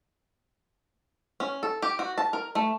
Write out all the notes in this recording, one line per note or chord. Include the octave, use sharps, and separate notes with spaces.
C#4
A4
G4
F#4
A5
A#4
A3